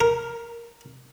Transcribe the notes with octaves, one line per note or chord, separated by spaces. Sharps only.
A#4